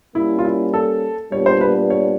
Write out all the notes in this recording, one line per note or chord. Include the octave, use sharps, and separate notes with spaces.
G3 A#3 C#4 E4
F4
E4
A4
A#2 G3 B3 D4 C#5
C5
B4
C#5